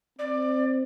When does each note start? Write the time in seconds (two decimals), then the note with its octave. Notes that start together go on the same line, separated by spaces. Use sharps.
0.19 C4 D5